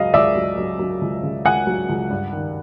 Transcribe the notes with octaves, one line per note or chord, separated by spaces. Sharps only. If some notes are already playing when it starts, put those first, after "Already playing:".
Already playing: C#2 C#3 F#3 D#5 F5
C#2 D5 E5
F#3
F#3
F#3
C#2
C#3
C#2 F#5 G#5
F#3
C#2
G2
D#3